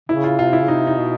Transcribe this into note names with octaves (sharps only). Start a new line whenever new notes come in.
C#3 E4
F4
C3 F4
E4
C#3
C3 D#4
D#4
B2